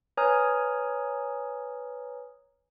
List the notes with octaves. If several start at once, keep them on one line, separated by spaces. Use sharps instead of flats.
B4 C#5 G#5 A#5 D#6 F6